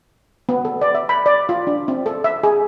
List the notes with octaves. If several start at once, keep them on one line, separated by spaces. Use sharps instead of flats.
B3
A4
D5
E5
B5
D5
F4
D4
C4
A4
E5
G#4